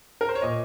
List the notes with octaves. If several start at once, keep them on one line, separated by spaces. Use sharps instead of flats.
A#4
C5
C#5
A#2 D#5